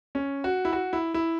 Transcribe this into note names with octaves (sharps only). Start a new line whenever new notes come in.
C#4
F#4
E4
F#4
E4
E4